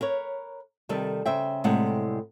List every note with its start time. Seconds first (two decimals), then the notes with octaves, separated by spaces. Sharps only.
0.01 A#4 B4 C#5
0.89 C3 D#3 G3 A4
1.26 C#3 C5 E5 G5
1.64 A2 C3 G3 G#3 A4 F#5